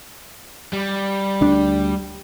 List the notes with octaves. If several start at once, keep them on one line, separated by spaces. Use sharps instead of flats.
G3
D2 D4